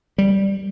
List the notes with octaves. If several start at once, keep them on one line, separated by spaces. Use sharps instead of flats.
G3